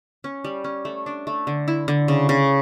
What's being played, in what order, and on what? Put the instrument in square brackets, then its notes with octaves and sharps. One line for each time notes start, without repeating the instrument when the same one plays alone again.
[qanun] C#4
G3
C#4
A3
D4
A3
D3
E4
D3
C#3
C#3